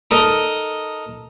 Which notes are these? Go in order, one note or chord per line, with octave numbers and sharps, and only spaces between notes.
D#4 A4 A#4 D#5